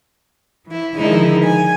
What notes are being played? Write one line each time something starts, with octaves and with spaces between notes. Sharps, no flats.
E3 E4
D3 D#3 F3 G#3 D#4 E4
G#5